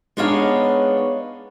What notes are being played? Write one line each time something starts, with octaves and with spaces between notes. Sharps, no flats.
G#3 B3 D4 D#4 C#5 F5